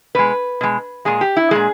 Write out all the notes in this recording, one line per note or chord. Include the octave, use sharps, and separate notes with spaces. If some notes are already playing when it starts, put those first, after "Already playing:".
B2 G#3 B4
B2 G#3
A#2 G#3 G#4
G4
E4
A#2 G#3 G#4